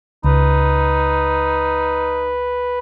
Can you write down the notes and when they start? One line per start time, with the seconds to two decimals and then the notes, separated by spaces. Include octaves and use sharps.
0.24 C#2 D#4 B4